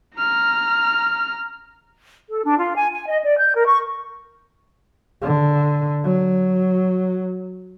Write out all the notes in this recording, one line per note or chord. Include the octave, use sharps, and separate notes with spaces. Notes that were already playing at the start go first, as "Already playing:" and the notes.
A#5 F6
A4
D4
F4
G#5
G#5
D#5
D5
G6
A#4
C#6
D3
F#3